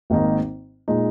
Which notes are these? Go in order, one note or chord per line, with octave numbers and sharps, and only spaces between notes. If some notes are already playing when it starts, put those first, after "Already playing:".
G#1 G#2 D#3 A#3 D#4
A#2 G#3 D#4